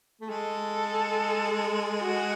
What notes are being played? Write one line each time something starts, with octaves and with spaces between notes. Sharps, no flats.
A3
G#3 A4
F#4